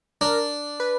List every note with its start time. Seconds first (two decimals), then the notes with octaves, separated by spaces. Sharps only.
0.21 D4 A#4
0.80 B4